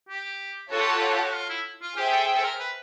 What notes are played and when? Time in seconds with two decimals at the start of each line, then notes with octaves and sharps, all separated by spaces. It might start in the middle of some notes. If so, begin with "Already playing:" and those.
0.09 G4
0.71 F4 F#4 A4 C#5 F#5 A5
0.81 G4
0.89 F#4
0.98 G4
1.07 F#4
1.15 G4
1.23 F#4
1.34 F4
1.50 E4
1.82 F4
1.97 G4 G#4 C5 E5 G5
2.12 A4
2.37 A4
2.44 A#4
2.60 B4